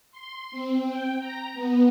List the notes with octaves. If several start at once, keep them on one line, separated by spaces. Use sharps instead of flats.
C6
C4
G5
A#5
B3